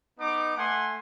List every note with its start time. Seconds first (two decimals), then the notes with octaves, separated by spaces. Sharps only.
0.18 B3 D#4 D6
0.56 A3 F#5 G#5 C6